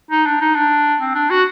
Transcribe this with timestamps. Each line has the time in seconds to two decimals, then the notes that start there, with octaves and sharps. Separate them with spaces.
0.11 D#4
0.26 D4
0.41 D#4
0.55 D4
1.00 C4
1.15 D4
1.30 F#4